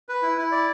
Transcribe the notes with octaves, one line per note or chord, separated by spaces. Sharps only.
B4
E4
E4
D5